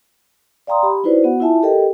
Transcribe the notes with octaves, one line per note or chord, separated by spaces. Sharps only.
D5 F5 G5 A#5 C6 D#6
G4 B5
D#4 E4 F#4 B4 C5 D5
B3 F#4 F#5
E4 F4 E5 G#5 A5
G4 A4 A#4 D#5 G5